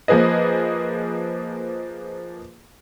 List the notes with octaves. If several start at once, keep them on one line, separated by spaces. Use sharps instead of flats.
F3 A#3 G#4 B4 D#5